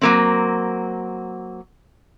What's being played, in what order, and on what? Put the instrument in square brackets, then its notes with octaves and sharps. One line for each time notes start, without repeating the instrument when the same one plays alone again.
[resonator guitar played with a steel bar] F#3 A#3 C4